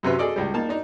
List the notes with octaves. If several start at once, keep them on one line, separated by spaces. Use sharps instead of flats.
F#2 C3 C#4 B4 E5
G#4 A4 D5 D#5
C#2 G3
A#3 D#4 A5
D4 D#4